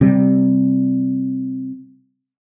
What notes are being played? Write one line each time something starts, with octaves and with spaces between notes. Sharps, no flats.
C3 G3